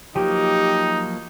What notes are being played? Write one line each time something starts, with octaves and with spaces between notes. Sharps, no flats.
F3 F#3 A#3 D#4 G4